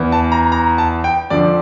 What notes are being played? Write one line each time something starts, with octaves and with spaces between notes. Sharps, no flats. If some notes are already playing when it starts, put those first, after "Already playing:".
Already playing: E2 E3
A5
A#5
A#5
A5
G5
F2 D3 F3 D5